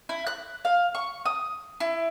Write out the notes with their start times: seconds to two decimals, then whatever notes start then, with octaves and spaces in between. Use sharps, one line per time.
0.09 E4
0.27 F#6
0.65 F5
0.95 C#6
1.26 D#6
1.80 E4